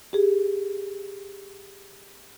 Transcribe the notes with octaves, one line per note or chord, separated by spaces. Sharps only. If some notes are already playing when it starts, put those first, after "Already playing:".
G4 G#4